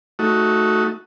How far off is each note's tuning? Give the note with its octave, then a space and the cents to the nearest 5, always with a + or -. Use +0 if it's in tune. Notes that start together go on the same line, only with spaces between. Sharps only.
A3 +0 D#4 +20 F#4 +0